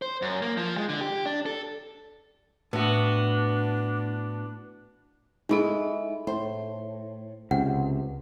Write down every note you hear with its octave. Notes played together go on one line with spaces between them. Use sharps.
C5
F#2
A#3
F3
G#3
D3
G4
D4
A4
A2 B3 D4 F#4
G#3 D#4 E4 G#4 A4
A2 C5
C#2 C3 F#5